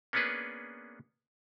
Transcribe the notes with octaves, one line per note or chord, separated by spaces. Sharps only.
A#3 B3 C#4 D4 G#4 B4